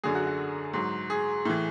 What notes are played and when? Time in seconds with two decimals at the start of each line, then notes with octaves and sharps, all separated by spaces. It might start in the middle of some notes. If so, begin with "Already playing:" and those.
0.04 F#2 D3 F#3 G#4
0.15 F#4
0.27 F#4
0.74 G#2 F#3
1.10 G#4
1.45 A2 E3